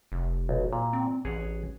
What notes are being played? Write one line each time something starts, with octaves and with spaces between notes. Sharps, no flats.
F1
B1
A#2
C4
A1 G#4 C#5 F#5